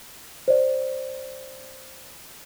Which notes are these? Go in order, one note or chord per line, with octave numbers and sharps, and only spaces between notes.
C5 D5